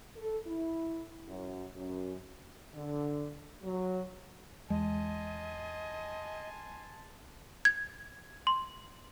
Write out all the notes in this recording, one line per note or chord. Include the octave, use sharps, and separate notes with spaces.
A4
E4
F#2
F#2
D3
F#3
E2 G#3 D#5 G#5 A5 C6
G#6
C6